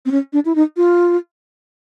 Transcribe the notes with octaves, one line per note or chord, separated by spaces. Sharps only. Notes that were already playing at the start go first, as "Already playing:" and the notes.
C4
C#4
D4
E4
D#4
F4